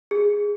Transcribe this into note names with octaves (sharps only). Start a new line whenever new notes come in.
G#4